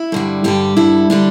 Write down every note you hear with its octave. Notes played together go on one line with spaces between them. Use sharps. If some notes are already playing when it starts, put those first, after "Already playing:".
Already playing: E4
G2 D3 G3
G2 D3 G3 G4
G2 D3 G3 E4
D3 G3 D4